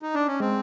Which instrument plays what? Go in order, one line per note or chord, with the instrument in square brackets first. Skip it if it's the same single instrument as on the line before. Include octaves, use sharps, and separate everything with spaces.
[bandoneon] D#4
D4
C#4
[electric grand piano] G#3 [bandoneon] C4